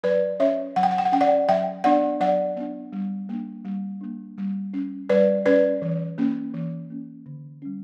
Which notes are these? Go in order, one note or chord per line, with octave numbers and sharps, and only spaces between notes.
F#3 B4 D5
C#4 C#5 E5
F#3 F#5
G5
F#5
G5
F#5
C#4 G5
D5 F#5
F#3 E5 G5
B3 D4 D5 F#5
F#3 D5 F#5
B3 D4
G3
A#3 D4
G3
A#3 D4
G3
C#4
G3 B4 D5
C#4 B4 D5
E3
A#3 C#4
E3
A#3 C#4
D3
G3 C#4